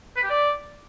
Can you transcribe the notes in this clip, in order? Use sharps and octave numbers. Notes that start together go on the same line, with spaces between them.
B4
G4
D5